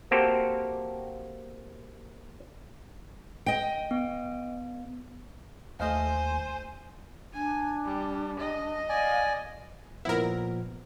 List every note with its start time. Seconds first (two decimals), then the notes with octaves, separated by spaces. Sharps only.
0.11 A#3 C4 F#4 G4 A4 C5
3.46 D#5 G5
3.91 B3
5.80 D#2 A3 C5 D#5 F5 G#5
7.34 D4 G#5
7.84 G3
8.39 D#5
8.89 D5 F5 G#5
10.05 A#2 F3 B3 E4 A#4